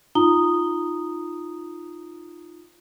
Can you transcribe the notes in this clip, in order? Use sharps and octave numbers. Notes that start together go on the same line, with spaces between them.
D#4 F4 A#5 D#6 G7